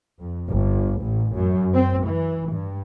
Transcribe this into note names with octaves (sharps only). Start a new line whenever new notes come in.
F2
G1
A1
F#2
C4
E3
G2